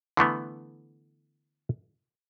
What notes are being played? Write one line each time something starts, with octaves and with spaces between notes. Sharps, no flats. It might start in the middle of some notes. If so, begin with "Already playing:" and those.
D3 E3 A3 B3